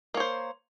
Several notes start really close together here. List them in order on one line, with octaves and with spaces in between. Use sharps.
A#3 C#5 C5